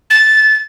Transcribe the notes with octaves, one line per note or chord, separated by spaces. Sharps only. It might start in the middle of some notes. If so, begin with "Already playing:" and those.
A6